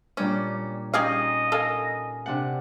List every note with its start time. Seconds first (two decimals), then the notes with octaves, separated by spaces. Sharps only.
0.17 A#2 G3 C#4 D4
0.94 C#4 D#4 G4 G#4 D#5 F5
1.52 A4 A#4 F5 G#5
2.26 C3 D4 F#5